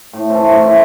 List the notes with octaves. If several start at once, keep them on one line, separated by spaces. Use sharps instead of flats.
A2
E3 A3 C4
A2
E3 A3 C4